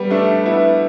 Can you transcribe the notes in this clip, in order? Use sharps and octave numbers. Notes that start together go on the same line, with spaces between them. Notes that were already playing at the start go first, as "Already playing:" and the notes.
Already playing: G3 B3
A3 D4
B3 E4